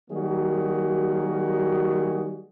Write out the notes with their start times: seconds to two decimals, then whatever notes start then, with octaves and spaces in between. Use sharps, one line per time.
0.11 D#3 F#3 G3 A#3 F#4 G#4